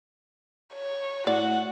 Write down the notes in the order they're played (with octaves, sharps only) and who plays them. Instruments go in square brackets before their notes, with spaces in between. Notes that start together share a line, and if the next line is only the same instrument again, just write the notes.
[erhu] C#5
[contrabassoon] A2 [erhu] F#4 [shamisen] D5 [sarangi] F#5